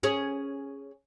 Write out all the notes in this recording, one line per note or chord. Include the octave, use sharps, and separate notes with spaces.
C#4 G#4